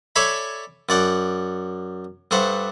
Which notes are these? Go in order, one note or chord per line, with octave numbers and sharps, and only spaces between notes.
A4 C#5 D5 E5 G#5 B5
F#2 D5 F#5 G5
G2 A3 C5 F#5